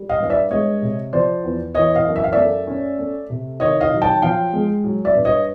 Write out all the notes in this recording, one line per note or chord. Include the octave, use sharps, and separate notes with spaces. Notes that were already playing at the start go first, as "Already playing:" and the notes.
Already playing: G3
D#5 F5
G2 F5
D5 E5
G#3 C#5 D#5
C3
F3 C5 D5
E2
E3 C#5 D#5
D#5 F5
F#2
E5
F5
A3 D5 E5
C#4
A3
C3
D#3 C#5 D#5
D#5 F5
F#3
G5 A5
F3 F5 G5
G#3
F#3
D5 E5
G2
C#5 D#5